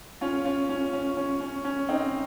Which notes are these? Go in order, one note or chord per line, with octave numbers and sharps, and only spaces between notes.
C#4 F4
C#4 F4
C#4
C#4
C#4
C#4
C#4
C4 D#4